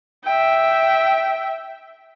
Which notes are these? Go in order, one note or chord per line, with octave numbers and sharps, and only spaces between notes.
E5 G5